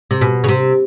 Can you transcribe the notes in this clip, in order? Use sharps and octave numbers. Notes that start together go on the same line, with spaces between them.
C3
B2
C#3
C3